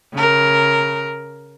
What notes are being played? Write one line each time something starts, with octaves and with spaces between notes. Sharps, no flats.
C#3 A#4